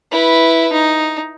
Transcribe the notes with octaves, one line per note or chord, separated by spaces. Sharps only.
E4 B4
D#4